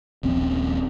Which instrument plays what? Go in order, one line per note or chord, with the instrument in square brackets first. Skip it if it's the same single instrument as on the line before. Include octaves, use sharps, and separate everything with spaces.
[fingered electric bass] D#1 A#1 C4 C#4